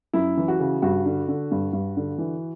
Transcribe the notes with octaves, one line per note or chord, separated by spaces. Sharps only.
F#2 E4
E3
F#4
C#3
G2 F#4
D3
D3
G2
G2
D3
E3